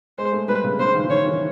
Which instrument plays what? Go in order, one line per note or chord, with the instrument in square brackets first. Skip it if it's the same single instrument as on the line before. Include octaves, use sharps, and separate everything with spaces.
[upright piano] G#3 [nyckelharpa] C5
[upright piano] A3
[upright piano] G3 [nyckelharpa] B4
[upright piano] C#3
[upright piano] C#3 [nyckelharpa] C5
[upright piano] D#3
E3
[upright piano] D#3 [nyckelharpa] C#5
[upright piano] E3